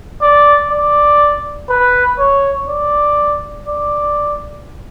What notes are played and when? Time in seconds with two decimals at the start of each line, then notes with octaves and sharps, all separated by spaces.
0.22 D5
0.71 D5
1.70 B4
2.19 C#5
2.68 D5
3.67 D5